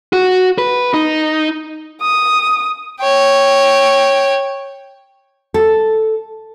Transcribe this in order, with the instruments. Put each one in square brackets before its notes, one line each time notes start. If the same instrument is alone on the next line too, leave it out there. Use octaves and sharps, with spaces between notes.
[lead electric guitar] F#4
B4
D#4
[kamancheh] D#6
[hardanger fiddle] C#5 G5
[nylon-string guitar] A4